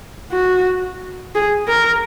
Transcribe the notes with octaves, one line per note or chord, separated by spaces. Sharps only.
F#4
G#4
A#4